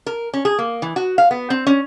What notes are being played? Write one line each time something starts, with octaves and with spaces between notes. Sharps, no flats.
A#4
C#4
G#4
A#3
E3
F#4
F5
B3
C4
C#4